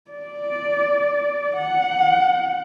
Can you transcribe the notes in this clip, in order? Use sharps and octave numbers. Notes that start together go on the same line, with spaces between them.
D5
F#5